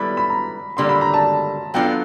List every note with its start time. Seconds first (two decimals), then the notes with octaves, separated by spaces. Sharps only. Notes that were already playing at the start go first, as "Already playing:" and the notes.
Already playing: G3 B3 E4 A4 B5
0.17 B5
0.30 A#5
0.77 D3 G3 A#3 C6
0.89 B5
1.01 A#5
1.14 A5
1.74 F#3 B3 D4 F4 A4 G5